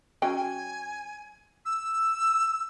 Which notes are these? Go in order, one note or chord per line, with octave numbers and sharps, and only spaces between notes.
F#3 C#4 G5 G#5
E6